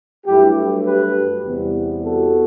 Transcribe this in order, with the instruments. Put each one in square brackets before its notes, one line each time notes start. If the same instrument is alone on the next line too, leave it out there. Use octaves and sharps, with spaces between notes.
[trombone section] G2 F#3 A3 E4 G4
G4 B4
E2 C3 G3 B3
F#4 A4